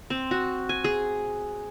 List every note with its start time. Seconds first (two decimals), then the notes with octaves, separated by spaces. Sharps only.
0.10 C4
0.31 F#4
0.69 G#5
0.84 G#4